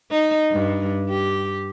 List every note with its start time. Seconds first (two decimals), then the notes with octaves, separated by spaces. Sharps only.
0.11 D#4
0.51 G2
1.09 G4